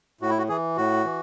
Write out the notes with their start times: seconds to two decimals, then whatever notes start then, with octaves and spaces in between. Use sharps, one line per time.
0.21 A2 F#4
0.30 E4
0.38 F#4
0.49 E3 G#4
0.77 A2 F#4
1.05 E3